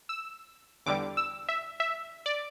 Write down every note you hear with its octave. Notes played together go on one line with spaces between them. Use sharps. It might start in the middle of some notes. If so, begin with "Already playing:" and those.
E6
E2 D3 G3 D6
E6
E5
E5
D5